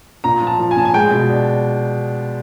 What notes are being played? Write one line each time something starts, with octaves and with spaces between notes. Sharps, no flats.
A#2 A#5
F3
A5
F3
G#5
A#2 A5
G#5
G#3 G5
B2
D4